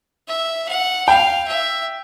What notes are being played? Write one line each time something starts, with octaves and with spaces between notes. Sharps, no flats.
E5
F#5
F5 G5
E5